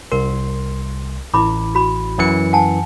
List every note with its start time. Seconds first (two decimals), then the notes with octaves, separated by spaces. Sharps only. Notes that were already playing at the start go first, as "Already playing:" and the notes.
0.12 C2 A#4 C6
1.34 A1 E4 B5 D6
1.75 F#4 B5
2.18 F#2 E3 C#7
2.53 F#5 G#5 A5